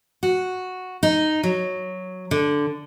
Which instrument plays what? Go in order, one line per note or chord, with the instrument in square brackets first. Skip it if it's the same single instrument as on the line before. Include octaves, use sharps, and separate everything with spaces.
[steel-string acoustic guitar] F#4
D#4
F#3
D3